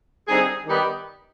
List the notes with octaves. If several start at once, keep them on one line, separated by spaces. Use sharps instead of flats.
D3 G3 C4 D#4 G#4
D#3 G3 B3 D#4 G4